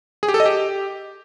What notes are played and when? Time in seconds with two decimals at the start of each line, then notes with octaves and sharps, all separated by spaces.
0.23 G#4
0.28 G4
0.34 A4
0.40 D#5
0.46 G4